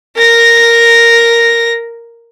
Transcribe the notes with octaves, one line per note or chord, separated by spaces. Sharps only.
A#4 A#6